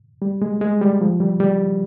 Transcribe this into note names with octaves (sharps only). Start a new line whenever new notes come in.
G3
G#3
G#3
G3
F3
G3
G3